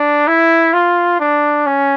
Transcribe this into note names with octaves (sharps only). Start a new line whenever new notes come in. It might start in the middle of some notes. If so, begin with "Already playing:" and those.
Already playing: D4
E4
F4
D4
C#4